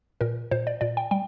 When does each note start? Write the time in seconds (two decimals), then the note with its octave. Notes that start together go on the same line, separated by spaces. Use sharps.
0.21 A#2 A#4
0.51 A#2 C5
0.67 D5
0.81 A#2 D5
0.97 G5
1.11 G3 G5